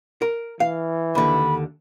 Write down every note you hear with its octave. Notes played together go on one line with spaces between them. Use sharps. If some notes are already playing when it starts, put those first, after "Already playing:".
A#4
E3 F5
D#2 D3 B5